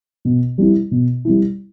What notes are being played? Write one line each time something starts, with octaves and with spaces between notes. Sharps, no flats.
B2
G3 C4 E4
B2
G3 C4 E4